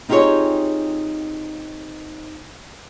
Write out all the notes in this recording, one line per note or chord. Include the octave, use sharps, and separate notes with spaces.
C4 D#4 F4 G4 G#4 C#5